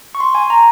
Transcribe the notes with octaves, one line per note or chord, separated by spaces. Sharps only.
C#6
C6
G#5
A#5